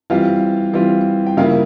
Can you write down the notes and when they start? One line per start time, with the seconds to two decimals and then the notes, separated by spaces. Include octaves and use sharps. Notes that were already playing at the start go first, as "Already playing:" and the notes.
0.10 E3 G3 C4 F4 F5
0.73 E3 G3 C4 F4
1.27 G5
1.37 C#3 G3 A#3 E4 F4 F5